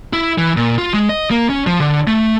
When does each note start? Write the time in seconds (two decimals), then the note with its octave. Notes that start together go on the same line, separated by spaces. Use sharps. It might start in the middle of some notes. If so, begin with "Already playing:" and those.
0.13 E4
0.38 E3
0.57 A#2
0.78 F4
0.94 G#3
1.09 D#5
1.31 A#3
1.50 C#4
1.67 F3
1.80 D3
2.07 A3